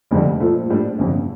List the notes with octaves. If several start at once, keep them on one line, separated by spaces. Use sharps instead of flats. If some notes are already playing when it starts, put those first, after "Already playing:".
F1 F2 D3 G3
A#2 F3 A3
A2 G3 D4
G1 F2 C3